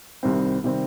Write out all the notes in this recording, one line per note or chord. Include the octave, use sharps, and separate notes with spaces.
C2 C3 D#3 G3 C4
C3 D#3 G3 C4